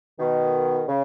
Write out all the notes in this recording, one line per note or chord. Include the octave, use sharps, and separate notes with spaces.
B2 D#3
C#3